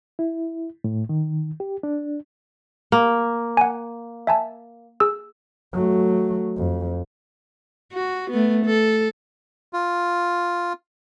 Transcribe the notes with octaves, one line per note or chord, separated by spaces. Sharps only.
E4
A2
D#3
G4
D4
A#3
F#5 G#5
E5 G#5 A5
G#4 E6
F#3 A3
F2
F#4
A3 B3
A4
F4